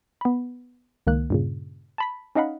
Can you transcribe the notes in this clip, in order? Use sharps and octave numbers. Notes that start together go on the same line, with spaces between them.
B3 B5
C#2 D#3 A#3 F#6
G2 A#2 C#3
A5 B5 B6
C#4 D#4 D#5 F5 F#5 B5